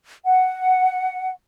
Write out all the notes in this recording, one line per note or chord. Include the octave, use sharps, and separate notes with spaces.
F#5